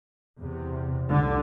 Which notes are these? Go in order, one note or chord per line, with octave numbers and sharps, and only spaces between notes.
E2 C3
C2 D3